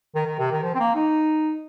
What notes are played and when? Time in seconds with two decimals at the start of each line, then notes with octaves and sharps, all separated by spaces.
0.15 D#3
0.27 D#3
0.39 C3
0.52 D#3
0.63 F3
0.75 C4
0.80 A#3
0.95 D#4